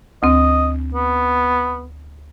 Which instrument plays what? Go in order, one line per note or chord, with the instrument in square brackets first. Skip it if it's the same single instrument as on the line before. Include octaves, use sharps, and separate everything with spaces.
[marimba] D2 C4 [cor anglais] D#5
[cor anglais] B3